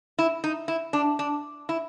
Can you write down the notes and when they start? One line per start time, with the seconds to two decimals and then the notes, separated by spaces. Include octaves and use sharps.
0.19 E4
0.44 D#4
0.68 E4
0.93 D4
1.19 D4
1.69 E4